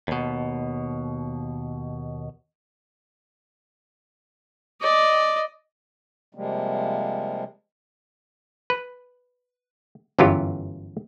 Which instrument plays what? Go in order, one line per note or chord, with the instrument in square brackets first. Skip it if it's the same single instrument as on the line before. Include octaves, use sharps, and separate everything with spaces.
[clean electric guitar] D#2 B2
[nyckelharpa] D5 D#5
[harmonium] C3 F3 G3 G#3 A#3
[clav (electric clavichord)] B4
G1 F#2 E3 F#3 F4 G4